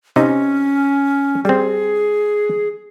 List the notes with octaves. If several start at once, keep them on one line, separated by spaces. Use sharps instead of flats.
C3 C#4 D#4
G3 C4 G#4